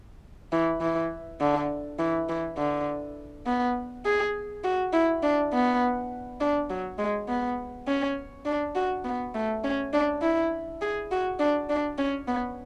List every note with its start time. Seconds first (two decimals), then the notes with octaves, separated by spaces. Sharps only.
0.52 E3
0.81 E3
1.40 D3
1.99 E3
2.29 E3
2.57 D3
3.46 B3
4.05 G#4
4.64 F#4
4.93 E4
5.23 D4
5.53 B3
6.40 D4
6.70 F#3
6.98 G#3
7.28 B3
7.87 C#4
8.45 D4
8.75 F#4
9.05 B3
9.34 A3
9.64 C#4
9.93 D4
10.22 E4
10.81 G#4
11.11 F#4
11.39 D4
11.69 D4
11.98 C#4
12.28 B3